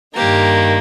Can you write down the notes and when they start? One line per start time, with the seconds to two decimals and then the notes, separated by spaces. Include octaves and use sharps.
0.14 G2 D#3 A#3 G4